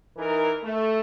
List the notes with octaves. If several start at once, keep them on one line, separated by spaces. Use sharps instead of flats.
E3 D#4 A#4
A3